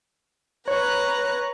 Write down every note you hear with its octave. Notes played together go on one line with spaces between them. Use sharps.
B4 C#5 A#5 F#6